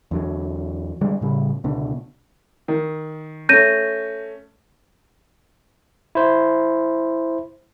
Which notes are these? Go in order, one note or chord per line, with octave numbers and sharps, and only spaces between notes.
E2 D3 F#3
D3 G3 G#3
A2 C#3 G3
C#2 B2 D3
D#3
A3 C#4 G6 A#6 D#7
E4 C5